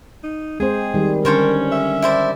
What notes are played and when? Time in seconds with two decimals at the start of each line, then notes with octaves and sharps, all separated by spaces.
0.24 D#4
0.60 G#3 C4 G#4 C5
0.94 D#3 G3
1.25 D3 C#4 A4 A#4 C5 C#5
1.72 E5
2.02 E4 C5 D5